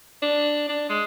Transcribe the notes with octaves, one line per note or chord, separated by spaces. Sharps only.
D4
D4
G#3